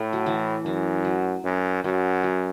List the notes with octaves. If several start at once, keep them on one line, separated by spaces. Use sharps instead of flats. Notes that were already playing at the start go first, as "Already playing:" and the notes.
Already playing: A2 A3
F#3
E3
F#2 E3
F#3
F#2
F#2 F#3
F#3